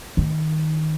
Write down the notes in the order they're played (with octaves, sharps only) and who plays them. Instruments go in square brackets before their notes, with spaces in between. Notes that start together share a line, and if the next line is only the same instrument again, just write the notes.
[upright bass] D#3